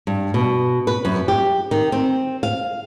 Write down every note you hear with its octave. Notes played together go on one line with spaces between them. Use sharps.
G2
B2
B4
F#2
G4
D#3
C4
F5